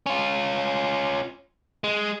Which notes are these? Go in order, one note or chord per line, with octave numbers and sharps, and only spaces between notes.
C#4 F4
G#3